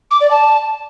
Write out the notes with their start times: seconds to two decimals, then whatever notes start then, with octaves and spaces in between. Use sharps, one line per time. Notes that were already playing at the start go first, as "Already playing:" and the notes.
0.11 D6
0.21 D5
0.31 A5